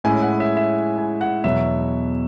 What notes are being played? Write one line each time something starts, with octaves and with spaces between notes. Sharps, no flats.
A2 G#3 C#4 E4 G#5
F#5
E5
E5
G#5
F#5
E2 B2 F#3 E5